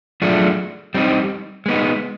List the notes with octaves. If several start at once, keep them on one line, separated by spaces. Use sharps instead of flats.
F#3 A3 D4 F4 G#4
G3 C4 D#4
G#3 B3 D#4